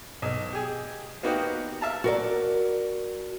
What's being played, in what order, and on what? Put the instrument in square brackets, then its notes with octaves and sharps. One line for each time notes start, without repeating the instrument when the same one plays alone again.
[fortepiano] B1
G4 G#4
A#3 B3 D#4 F#4 G4
E5 F5 A5 A#5
[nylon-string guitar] F#4 A#4 D5